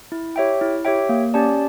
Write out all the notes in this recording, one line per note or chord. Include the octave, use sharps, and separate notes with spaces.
E4
G4 C#5 E5 G5
E4
G4 C#5 E5 G5
A#3
C#4 G4 D5 A5